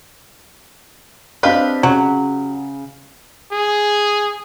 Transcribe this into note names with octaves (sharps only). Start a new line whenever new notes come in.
C4 D4 G4 B4 D#5 F5
C#3 F#3
G#4